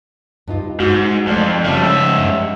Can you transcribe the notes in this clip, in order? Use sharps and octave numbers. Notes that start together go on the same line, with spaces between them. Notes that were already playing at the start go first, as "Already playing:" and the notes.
G2 D#4 F4
G#2 F#4
F2 A3 D5
C#3 F3 G3 A3 C#4
G#2 E5
G2